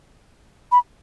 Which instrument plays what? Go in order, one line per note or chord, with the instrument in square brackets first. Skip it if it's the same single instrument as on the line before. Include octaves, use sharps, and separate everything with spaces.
[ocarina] B5